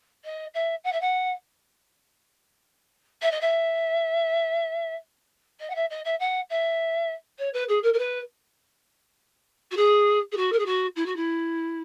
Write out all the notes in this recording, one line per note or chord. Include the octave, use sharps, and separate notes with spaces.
D#5
E5
F#5
E5
F#5
E5
D#5
E5
D#5
F#5
E5
D#5
E5
F#5
E5
C#5
B4
G#4
A#4
A#4
B4
F#4
G#4
G#4
F#4
A#4
G#4
F#4
E4
F#4
E4